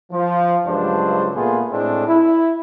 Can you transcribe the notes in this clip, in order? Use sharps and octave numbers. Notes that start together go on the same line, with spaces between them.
F3
C#2 G2 F#3 D4 C5
A#2 A3 B3 F4 G#4
A2 G#3 A3 C4 D4
E4